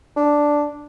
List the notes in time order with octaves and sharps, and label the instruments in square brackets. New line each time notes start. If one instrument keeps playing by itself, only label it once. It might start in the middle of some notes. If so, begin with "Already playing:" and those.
[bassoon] D4